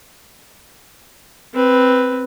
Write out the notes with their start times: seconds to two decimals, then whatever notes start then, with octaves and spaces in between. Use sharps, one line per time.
1.54 C4 B4